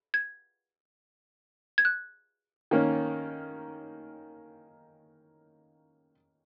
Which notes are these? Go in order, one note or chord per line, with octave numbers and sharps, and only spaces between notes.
G#6
G#6
F#6
D#3 A#3 C#4